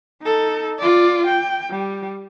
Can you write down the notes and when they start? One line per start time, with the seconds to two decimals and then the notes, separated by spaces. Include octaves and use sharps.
0.22 D#4 A4
0.79 F4 D5
1.26 G5
1.70 G3